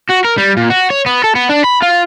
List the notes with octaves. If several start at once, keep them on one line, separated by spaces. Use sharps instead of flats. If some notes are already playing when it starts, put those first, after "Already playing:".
F#4
A#4
G3
A#2
F#4
C#5
B3
A4
B3
D4
B5
F4